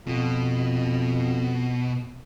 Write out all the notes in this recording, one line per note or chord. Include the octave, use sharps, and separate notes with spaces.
F2 B2